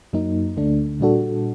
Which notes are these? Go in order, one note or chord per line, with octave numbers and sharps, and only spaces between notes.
F#2 F#3 A#3 D#4
D2 D3 A3 D4
A#2 G3 D4 F#4 A4